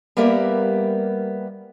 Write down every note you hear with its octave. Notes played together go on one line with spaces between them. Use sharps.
G3 A#3 B3 G4 A#4 E5